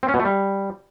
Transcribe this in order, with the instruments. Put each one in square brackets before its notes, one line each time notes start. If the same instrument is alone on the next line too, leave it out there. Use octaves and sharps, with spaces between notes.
[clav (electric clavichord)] C4
C#4
B2
A3
G3